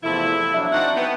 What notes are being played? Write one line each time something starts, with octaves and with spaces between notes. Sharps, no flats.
E2 C3 F3 A3 E4
F3 F#3 D4 E5
C4 D4 D#4 F#4 F#5
B3 F#5 G5